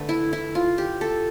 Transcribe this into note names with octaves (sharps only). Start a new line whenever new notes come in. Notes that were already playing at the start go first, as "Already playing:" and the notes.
Already playing: D3 A3 B4
E4
E4
F4
G4
A4